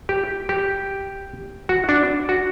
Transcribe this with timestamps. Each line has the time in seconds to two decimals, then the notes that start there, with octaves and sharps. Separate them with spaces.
0.09 G4
0.49 G4
1.69 F#4
1.89 D4
2.29 F#4